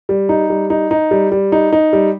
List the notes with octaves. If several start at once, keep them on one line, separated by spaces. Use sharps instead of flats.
G3
D#4
G3
D#4
D#4
G3
G3
D#4
D#4
G3